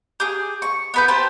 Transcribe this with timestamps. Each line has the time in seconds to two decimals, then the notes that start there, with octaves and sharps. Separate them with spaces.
0.20 G4 G#4
0.62 C#6
0.94 B3 B4 G6
1.08 G4 B4 C5 A5